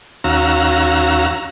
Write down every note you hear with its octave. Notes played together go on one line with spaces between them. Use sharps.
D#2 C#4 F#4 F5 A#5 E6